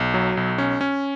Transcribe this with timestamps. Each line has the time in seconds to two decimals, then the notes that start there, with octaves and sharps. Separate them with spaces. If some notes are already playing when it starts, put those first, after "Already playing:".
Already playing: B1
0.14 F#3
0.37 B1
0.58 C#4
0.81 C#4